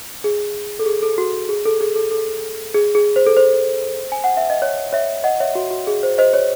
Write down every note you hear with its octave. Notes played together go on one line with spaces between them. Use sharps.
G#4
A4
G#4
A4
F#4
G#4
A4
G#4
A4
A4
G#4
G#4
C5
A4
C5
G#5
F#5
E5
D#5
C#5
C#5 E5
D#5 F#5
C#5 E5
F#4
F#4
G#4
C5
C5 D#5
C#5